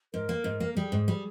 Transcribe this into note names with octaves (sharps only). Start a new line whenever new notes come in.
G#2 A#4
A#3
G#2
A#3
G3 G#4
G#2
G3